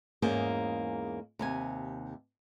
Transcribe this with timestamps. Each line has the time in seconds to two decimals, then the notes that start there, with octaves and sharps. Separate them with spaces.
0.22 E2 G#2 A#3 C#4 G#4 C5
1.39 D#2 C3 G#5